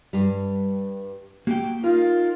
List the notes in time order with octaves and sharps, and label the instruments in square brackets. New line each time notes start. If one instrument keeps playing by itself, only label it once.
[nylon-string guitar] G2 G3
[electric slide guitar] A#3 G5 [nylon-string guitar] F#4 G4
[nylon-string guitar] D#4 [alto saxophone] F4 [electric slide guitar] A#4